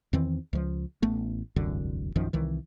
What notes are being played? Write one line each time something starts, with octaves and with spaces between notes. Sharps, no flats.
E2 D#3 E3 C4
C#2 F3
A1 A3 B3
E1 C2 F#2 D3
A#1 F#2 D#3 F3
C2 D#3 E3